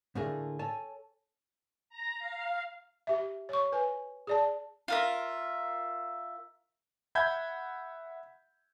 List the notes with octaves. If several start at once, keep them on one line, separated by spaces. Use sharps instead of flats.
A2 D3 A3 A#3 G#4
A4 C#5 G#5 A5
A#5
F5
G4 E5
C#5 C#6
B4 G#5
G#4 D5 A5
F4 A#4 E5
E5 F#5 B5 G6 G#6